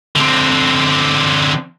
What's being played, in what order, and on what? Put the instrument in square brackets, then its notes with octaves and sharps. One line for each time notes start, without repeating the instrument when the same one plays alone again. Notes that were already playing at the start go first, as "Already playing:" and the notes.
[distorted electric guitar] D3 C4